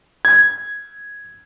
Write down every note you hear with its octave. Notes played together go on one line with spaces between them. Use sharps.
G#6